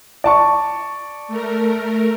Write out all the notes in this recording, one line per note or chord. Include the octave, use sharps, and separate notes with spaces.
D5 A5 C#6
A3 A#4